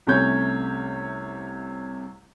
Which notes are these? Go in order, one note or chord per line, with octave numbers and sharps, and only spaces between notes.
C2 C3 A3 C#4 C#5 G6